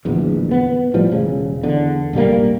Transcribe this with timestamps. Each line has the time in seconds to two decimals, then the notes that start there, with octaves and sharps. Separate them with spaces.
0.05 D1 A#1 E2
0.51 B3
0.94 A2 F3 G3
1.12 E1 C#3
1.63 E2 D3
2.13 F1 A#1 G3 A#3